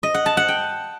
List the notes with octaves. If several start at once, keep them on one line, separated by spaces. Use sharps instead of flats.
D#5
F#5
A5
F#5
G5